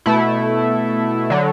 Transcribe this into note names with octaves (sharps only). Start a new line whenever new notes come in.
B2 A3 E4
D3 F#3